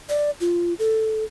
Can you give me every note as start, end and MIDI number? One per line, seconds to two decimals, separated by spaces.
0.09 0.31 74
0.41 0.74 65
0.79 1.24 69